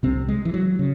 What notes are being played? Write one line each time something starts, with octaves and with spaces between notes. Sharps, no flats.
C2 C3 C4
G#3
E3
F#3
C#3